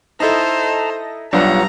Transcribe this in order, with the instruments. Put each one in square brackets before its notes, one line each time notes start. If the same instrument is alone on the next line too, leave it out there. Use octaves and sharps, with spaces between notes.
[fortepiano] D#4 E4 [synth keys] A4 D#5 A#6 [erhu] C5 [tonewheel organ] A5 A#5
[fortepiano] B1 B3 [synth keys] G3 D4 [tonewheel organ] F4 C#5 F#5 [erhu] A#5